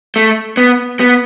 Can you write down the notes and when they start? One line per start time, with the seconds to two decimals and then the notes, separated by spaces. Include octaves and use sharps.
0.16 A3
0.57 B3
1.00 B3